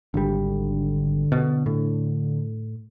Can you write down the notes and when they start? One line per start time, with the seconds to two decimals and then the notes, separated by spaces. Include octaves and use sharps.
0.14 G#1 D3 G3
1.32 B2
1.66 A2